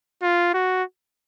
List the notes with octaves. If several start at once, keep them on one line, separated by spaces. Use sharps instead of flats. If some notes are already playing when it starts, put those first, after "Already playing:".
F4
F#4